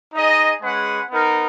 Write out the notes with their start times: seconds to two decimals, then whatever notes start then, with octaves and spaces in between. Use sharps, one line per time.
0.14 D#4 G#4 D#5
0.62 G#3 C#4 G#4 B4 F#5
1.11 B3 D#4 A#4